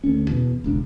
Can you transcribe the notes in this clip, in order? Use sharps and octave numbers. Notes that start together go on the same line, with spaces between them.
D2 C#4
E2 B2
E1 C#2 D4